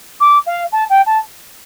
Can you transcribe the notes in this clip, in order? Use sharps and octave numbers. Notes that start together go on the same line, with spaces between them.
D6
F5
A5
G5
A5